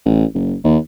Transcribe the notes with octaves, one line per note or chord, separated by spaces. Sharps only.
A1
F#1
D#2